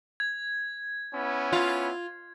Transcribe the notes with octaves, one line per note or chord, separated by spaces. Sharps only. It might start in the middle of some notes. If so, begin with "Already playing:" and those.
G#6
B3 C#4 E4
F4